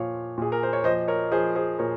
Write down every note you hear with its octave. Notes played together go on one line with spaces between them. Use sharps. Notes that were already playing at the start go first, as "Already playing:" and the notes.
Already playing: A#2 F3 C#5 F5
A#2 G#4
A#4
C5
C#5
F3 C5 D#5
A#4 C#5
F3 G#4 C5
G#4 C5
A#2 A#4 C#5